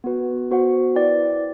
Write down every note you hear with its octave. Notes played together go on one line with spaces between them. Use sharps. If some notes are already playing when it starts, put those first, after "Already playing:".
B3 F#4 B4
B3 F#4 C5 F#5
E4 B4 D5 G5